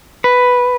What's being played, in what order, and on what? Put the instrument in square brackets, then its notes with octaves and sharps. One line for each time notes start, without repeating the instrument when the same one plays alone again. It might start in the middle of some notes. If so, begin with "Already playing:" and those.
[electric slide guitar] B4